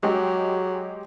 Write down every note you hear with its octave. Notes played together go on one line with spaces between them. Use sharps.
F#3 G#3 G4